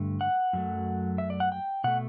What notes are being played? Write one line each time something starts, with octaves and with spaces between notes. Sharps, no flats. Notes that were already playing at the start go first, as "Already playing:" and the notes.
Already playing: G2 D3 A3
F#5
F#2 F#3 A3
E5
D5
F#5
G5
B2 A3 F#5